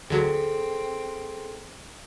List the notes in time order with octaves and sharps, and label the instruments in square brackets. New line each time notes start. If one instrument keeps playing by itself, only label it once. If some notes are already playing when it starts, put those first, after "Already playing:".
[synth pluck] D2 F#3 [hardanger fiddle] C4 [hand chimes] G#4 A4